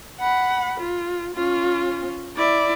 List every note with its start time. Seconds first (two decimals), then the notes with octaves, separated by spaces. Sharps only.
0.20 F#5 B5
0.80 F4
1.34 C#4 F4
2.36 E4 D5